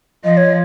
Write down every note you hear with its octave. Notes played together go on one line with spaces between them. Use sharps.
F3 D#5
C#5